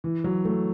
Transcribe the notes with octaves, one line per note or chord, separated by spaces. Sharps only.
E3
F#3
A3